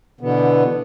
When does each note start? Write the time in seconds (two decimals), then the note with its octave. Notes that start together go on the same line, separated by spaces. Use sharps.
0.21 B2 D3 E3 B3